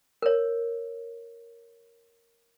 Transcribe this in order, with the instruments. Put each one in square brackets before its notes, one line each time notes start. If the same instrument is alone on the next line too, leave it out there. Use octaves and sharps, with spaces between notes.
[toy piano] A#4 C#5